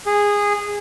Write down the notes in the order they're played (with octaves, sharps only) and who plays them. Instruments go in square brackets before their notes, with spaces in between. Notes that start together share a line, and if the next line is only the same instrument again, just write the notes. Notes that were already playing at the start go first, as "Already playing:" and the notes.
[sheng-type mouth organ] G#4